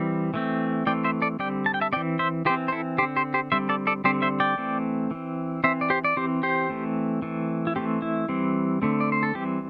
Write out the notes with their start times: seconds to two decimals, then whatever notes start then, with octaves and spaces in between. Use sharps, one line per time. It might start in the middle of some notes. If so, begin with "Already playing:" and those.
Already playing: E3 G3 C4
0.34 E3 A3 C4
0.86 E3 A3 C4 D5 G5
1.04 C5 E5
1.22 A4 D5
1.39 D3 G3 C4 D5 G5
1.66 A5
1.74 G5
1.81 E5 A5
1.92 C4 D5 G5
1.96 E3
2.19 C5 E5
2.45 E3 G4 C5
2.50 C4
2.68 C5
2.72 E4 A4
2.98 D3 G4 C5
3.03 C4
3.16 G4 C5
3.34 G4 C5
3.52 D3 G3 C4 C5 E5
3.69 A4 D5
3.87 A4 D5
4.04 D3 G3 C4 G4 C5
4.22 C5 E5
4.40 D5 G5
4.58 E3 A3 C4
5.11 E3 C4
5.64 E3 C4 C5 E5
5.81 D5
5.90 G4 C5
6.04 D5
6.17 E3 C4 G4 C5
6.43 G4 C5
6.70 E3 A3 C4
7.22 E3 A3 C4
7.67 E4
7.76 E3 A3 C4 G4
8.02 E4
8.29 E3 G3 C4
8.82 D3 A3 C4
9.01 D5
9.12 C5
9.23 A4
9.35 E3 G3 C4 G4